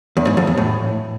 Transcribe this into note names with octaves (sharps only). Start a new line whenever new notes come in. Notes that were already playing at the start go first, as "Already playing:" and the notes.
E2
G#2
F2
E2
A2